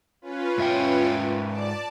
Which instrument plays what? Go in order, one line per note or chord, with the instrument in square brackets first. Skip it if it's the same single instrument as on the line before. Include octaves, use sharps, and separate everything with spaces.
[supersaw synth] C#4 F4 B4
[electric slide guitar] G#2 E5 G5
[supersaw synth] D5 A5 D6